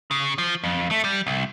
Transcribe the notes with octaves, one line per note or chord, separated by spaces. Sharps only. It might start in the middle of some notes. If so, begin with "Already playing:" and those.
C#3
F3
F2
A3
G3
C2